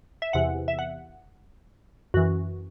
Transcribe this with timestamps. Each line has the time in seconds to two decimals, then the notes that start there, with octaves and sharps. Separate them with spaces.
0.22 E5
0.33 E2 C3 E3 F#5
0.68 E5
0.79 F#5
2.14 F#2 E3 F#4